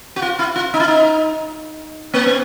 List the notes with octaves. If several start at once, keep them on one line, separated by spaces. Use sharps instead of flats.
F#4
F4
E4
F4
D#4
E4
D#4
A#3
B3